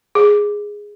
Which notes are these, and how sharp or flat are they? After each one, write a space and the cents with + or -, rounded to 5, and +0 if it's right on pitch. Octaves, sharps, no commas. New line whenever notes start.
G#4 -5